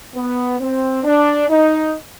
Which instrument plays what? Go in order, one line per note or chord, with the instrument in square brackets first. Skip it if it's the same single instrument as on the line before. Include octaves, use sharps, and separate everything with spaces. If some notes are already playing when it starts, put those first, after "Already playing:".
[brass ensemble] B3
C4
D4
D#4